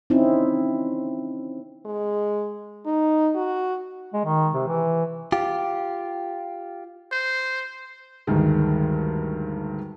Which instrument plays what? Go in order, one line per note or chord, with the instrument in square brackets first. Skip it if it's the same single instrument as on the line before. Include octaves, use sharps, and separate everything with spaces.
[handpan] C4 C#4 D#4 E4
[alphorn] G#3
D#4
F#4
[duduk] G#3
D#3
C3
E3
[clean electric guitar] F4 G4
[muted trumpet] C5
[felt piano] D2 G2 D#3 G#3